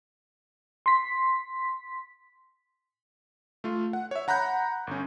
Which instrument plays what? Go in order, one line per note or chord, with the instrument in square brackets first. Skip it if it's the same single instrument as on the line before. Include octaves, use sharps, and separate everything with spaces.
[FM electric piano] C6 B6
[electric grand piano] A3 F4
F#5
C#5 E5
F#5 A#5 B5 F#6 G6
G1 C#4